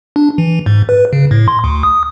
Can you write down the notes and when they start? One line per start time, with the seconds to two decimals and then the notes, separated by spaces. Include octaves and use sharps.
0.16 D4
0.38 E3
0.66 G#2
0.89 B4
1.13 C#3
1.31 A2
1.48 C6
1.64 D2
1.83 D#6